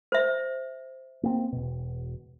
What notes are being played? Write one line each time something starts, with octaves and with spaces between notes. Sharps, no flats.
C5 E5
A#3 C4
E1 B2